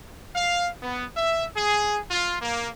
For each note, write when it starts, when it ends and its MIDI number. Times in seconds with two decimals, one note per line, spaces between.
0.35 0.68 77
0.83 1.05 59
1.15 1.45 76
1.55 1.98 68
2.11 2.37 65
2.42 2.67 58